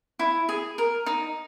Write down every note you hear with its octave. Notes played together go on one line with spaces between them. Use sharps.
E4
G#4
A#4
D#4